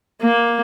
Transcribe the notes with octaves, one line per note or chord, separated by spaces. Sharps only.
A#3